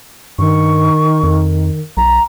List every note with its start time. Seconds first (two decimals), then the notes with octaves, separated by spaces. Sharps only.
0.39 G2 D#3 C#6
1.23 F2
1.97 B1 A#5